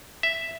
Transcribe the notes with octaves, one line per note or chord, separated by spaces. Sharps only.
E5